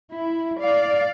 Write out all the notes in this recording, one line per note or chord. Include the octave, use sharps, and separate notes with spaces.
E4
D5 F5